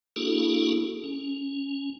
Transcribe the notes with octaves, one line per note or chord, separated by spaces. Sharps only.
A#3 D4 E4 F#4 G#4 A4
C#4